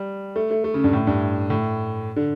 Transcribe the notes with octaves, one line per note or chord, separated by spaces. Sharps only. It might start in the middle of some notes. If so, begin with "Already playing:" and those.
Already playing: G3
A3
A3
A3
C#3
G2
A2
G2
A2
D3